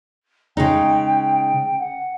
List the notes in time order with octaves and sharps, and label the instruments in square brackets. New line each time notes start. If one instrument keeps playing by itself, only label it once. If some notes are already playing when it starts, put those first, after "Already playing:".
[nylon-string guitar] C#3 G#3 D#4 [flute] G5
[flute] F#5